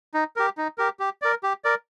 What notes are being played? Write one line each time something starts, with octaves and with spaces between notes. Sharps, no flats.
D#4
G4 A#4
D#4
G4 A#4
G4
A#4 D5
G4
A#4 D5